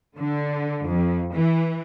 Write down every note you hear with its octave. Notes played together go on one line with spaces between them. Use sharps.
D3
F2
E3